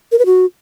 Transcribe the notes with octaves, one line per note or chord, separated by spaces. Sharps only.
A#4
B4
F#4